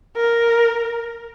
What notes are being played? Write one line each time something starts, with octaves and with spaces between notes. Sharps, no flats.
A#4